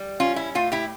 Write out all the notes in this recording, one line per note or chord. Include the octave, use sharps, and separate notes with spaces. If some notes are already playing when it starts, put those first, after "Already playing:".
Already playing: G3
C#4 F4
E4
A2 F4
E4 G4